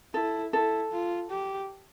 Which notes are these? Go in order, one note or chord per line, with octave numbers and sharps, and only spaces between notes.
E4 A4
E4 A4
F4
G4